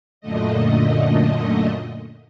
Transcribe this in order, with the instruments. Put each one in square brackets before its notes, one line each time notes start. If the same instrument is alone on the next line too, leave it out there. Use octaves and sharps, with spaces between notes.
[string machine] F#2 A#2 D3 A3 D#5